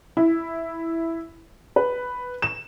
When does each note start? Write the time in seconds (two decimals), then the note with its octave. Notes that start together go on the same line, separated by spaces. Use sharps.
0.17 E4
1.76 B4
2.42 E7